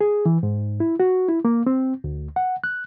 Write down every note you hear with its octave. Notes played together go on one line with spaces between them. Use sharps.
G#4
E3
G#2
E4
F#4
E4
A#3
C4
D2
F#5
F#6